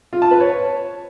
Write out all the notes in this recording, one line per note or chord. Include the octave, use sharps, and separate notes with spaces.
F4
A5
B4
C#5